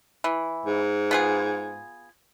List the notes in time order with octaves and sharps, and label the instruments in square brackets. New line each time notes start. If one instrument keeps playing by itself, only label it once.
[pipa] E3
[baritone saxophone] G#2
[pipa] B3 F4 G#4